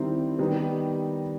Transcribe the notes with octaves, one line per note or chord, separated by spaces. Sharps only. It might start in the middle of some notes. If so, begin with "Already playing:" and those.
Already playing: D#3 G3 C4 E4
D#3 G3 B3 D#4